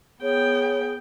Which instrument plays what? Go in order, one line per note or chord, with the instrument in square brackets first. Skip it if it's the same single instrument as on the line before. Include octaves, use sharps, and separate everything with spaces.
[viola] B3 G5 [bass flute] G#4 [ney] C#5